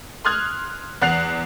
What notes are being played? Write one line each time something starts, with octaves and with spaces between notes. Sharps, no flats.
C6 D#6 F6 F#6 G#6
E2 F#5 F#6 C7 F7